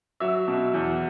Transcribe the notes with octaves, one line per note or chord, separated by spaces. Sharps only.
F#3 E5
B2
E2